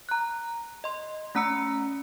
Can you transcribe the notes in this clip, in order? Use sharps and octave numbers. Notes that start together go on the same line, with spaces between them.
A#5 F#6
D#5 C6
A3 C#4 A#5 E6 C#7